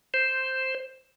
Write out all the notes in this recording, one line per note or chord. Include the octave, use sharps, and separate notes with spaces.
C5